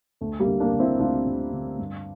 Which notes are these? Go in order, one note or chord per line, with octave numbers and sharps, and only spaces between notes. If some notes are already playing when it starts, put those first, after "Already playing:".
D2 A3
G3 A#3
D3
A#3 D4
D3
C4 E4
D2 D4 F4
D2
D3
G2